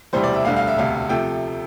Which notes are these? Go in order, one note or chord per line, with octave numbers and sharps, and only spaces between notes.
E1 D2 C3 E3 G3 C5
D5
E5
E1 D2 D3 G3 F5
F5
E5
E1 D2 C3 F5
C3 F3 A3 G5